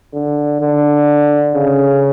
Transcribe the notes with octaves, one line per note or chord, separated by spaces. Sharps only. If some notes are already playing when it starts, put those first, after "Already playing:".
D3
D3
C#3